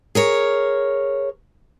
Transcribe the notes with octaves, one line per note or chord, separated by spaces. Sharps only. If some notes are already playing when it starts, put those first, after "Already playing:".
G#4 A#4 C#5